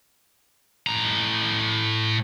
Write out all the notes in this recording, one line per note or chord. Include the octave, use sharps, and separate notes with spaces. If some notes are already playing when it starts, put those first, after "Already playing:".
A2 A#5